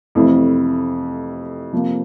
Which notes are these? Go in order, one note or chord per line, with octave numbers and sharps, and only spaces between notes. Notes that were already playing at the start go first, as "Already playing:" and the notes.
F2 C3 E3 A3 E4
C3 F3 A#3